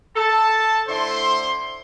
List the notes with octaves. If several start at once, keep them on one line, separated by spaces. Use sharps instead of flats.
A4 A5
D3 A3 E4 C5 C6